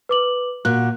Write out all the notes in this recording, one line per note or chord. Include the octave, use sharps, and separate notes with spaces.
B4 D6 F#7
A#2 F#4 F#6